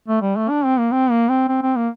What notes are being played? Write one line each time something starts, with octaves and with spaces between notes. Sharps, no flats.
A3
G3
A3
D4
C4
A#3
C4
A#3
C4
C4
C4
A#3